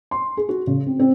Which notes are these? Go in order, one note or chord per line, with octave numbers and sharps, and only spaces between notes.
C6
G#4
F#4
C#3
C4
C4